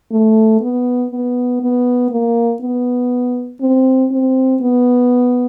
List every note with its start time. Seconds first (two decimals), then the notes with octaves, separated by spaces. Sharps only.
0.12 A3
0.61 B3
1.11 B3
1.61 B3
2.11 A#3
2.62 B3
3.61 C4
4.11 C4
4.62 B3